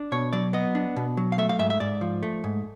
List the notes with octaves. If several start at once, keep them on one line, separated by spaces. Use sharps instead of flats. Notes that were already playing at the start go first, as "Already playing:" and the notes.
Already playing: D4
B2 C#5
F#3 D5
B3 D#5
D4
B2
F#3
F5
A3 E5
F5
G#2 E5
E5
G#2 D5
F3
A3
G#2